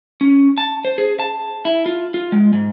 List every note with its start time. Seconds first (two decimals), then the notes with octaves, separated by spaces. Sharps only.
0.21 C#4
0.58 A5
0.85 C5
0.98 G#4
1.19 A5
1.65 E4
1.86 F4
2.14 F4
2.32 G#3
2.53 G#2